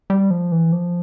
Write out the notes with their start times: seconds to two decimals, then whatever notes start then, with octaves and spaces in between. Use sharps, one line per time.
0.10 G3
0.31 F3
0.52 E3
0.72 F3